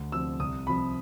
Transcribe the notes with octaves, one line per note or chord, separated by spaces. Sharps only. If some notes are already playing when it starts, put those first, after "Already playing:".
Already playing: D2
C3 F3 E6
C2 D#6
C3 F3 B5